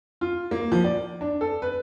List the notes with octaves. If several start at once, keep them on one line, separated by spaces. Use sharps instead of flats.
F4
A#3
F3
D5
D4
A4
B4